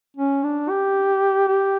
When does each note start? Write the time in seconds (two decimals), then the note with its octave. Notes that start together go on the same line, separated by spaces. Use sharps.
0.17 C#4
0.43 D4
0.69 G4
1.48 G4